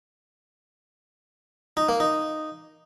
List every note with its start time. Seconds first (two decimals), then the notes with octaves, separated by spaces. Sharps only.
1.77 D#4
1.89 A#3
2.00 D#4